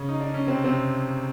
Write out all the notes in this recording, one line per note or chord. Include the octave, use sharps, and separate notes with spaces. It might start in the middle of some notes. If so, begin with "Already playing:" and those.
Already playing: C#3 C#4
D#4
D4
C#4
C3 C4
C3 C4